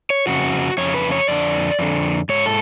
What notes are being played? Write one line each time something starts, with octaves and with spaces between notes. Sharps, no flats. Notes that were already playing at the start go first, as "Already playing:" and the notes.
C#5
F2 C#3 F#4
F2 C#3 C#5
B4
C#5
F2 D3 D5
F2 D3
G#2 C#5
A4